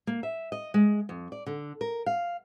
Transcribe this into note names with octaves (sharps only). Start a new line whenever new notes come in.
A#3
E5
D#5
G#3
F2
D5
D3
A#4
F5